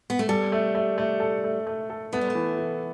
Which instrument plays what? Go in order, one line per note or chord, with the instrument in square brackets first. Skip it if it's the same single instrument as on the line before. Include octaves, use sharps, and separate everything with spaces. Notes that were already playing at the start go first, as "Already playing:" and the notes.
[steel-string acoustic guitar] B3
A3
[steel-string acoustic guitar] G3 [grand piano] A4
[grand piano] A3
A3
A3
A4
A3
A3
A4
[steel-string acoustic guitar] A3 [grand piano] B3
[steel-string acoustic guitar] G3
A3
[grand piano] E3
E3